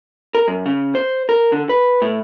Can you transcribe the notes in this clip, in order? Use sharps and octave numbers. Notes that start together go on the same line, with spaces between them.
A#4
F#2
C#3
C5
A#4
D3
B4
A2